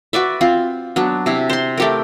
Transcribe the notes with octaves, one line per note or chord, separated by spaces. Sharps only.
F#4 B4 D5 E5
C4 F4
F#3 B3 D4
C3 E4
C5 C6
A3 G4 A#4